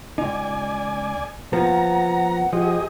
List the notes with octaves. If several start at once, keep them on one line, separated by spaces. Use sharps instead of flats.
C#2 D#4 D5 G#5
F3 A#3 B3 F#5 A#5
F3 G4 G#4 D#5